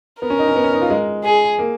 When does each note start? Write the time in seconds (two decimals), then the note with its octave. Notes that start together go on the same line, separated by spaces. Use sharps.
0.21 B3 A#4
0.30 C#4
0.39 D#4
0.48 C#4
0.56 B3
0.64 C#4
0.73 D#4
0.82 F4
0.90 G#3
1.24 G#4
1.59 A#3